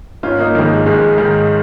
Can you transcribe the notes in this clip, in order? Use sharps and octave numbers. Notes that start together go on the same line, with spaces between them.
G#1 C#4 F4
A#3 D#4
G#2 D#3 F3 A#3
G#3
G#1 G#3
G#2 D#3